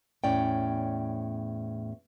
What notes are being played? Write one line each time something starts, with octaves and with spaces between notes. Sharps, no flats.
E2 A2 C#4 D5 G5